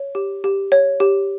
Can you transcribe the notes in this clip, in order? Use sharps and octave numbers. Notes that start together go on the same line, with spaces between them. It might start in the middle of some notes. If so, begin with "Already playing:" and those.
Already playing: C#5
G4
G4
C#5
G4